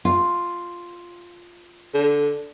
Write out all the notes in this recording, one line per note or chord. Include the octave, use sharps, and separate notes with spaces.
F4
D3